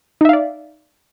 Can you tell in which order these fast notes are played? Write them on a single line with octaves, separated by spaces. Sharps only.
D#4 E5 F5 D5